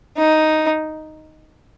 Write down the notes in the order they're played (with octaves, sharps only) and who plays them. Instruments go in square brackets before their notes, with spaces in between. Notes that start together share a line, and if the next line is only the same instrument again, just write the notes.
[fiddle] D#4